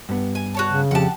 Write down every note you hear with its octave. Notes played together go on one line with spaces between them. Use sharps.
G2 B3
G#5
F#4 C#5 A5
C#3
F2 G4 F#5 A5